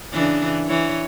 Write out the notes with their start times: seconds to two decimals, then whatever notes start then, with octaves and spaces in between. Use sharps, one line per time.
0.12 C#3 E3 D4
0.67 E3 C#5